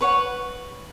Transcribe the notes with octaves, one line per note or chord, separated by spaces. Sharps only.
B4 C#5 F#5